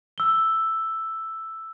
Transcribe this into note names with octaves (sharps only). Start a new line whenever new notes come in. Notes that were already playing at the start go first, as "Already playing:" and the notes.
E6 G7